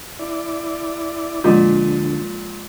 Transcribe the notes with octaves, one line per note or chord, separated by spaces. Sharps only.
E4 D5
D2 A#2 F3 G#3